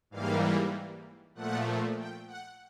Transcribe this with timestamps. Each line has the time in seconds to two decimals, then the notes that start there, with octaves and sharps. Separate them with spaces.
0.10 G#2 E3 G3 A#3 F5
1.35 A#2 F3 A3 F#5
1.98 G5
2.28 F#5